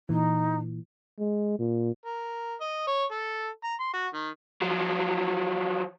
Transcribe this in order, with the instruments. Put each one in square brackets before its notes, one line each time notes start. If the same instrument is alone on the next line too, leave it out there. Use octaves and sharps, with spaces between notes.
[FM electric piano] A#2 E3 [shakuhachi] D#4
[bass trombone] G#3
A#2
[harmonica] A#4
D#5
C#5
A4
A#5
C6
F#4
D#3
[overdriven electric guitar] F3 F#3